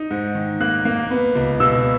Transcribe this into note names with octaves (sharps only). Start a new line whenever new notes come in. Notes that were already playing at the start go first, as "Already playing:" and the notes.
Already playing: D#4
G#2
D#3
A#3 F#6
A#3
B3
C#2
B2 E6